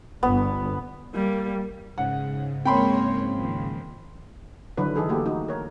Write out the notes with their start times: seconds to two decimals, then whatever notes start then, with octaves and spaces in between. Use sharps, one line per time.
0.23 G1 B3
1.14 G3 A#3
1.98 G#2 C#3 F#5
2.65 G#3 A#3 C4 C#5 G5 B5 C6
3.34 D#3 F3 A#3
4.77 D3 D#3 F#3 E4 B4
4.96 E3 D#4 G#4 A4
5.09 A3 A#3 F#4 G4 A4
5.26 D#4 F#4
5.48 A#4 C#5